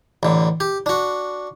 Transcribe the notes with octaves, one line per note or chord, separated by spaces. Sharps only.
A1 D3
G4
D4 F#4